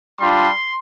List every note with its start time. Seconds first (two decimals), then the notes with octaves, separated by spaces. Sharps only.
0.20 G3 D4 F4 C6